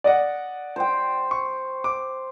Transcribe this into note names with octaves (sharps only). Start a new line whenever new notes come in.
D5 D#5 F#5
C5 G5
C#6
D6